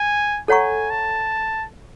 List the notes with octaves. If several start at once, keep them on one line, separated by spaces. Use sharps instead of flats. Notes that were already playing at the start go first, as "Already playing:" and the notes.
Already playing: G#5
A4 C#5 F#5 G#5 A#5 C#6
A5